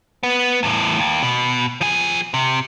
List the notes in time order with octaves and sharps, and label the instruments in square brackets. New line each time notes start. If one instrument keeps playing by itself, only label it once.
[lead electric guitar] B3
E2 A2
D#2
B2
F3 G#4
C3